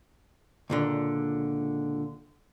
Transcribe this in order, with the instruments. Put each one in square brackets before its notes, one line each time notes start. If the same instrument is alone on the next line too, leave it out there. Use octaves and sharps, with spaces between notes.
[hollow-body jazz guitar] C#2 A#2 D3